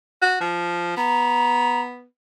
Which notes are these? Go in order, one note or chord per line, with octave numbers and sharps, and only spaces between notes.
F#4
F3
B3 A#5